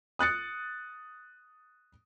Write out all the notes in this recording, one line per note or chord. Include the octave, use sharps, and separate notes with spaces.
D#6 F#6 A6 C#7